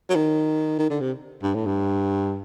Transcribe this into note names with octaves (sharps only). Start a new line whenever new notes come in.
F#3
D#3
D#3
D3
C3
G2
A2
G2